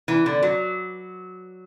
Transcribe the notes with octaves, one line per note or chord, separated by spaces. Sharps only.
E3
D3
F#3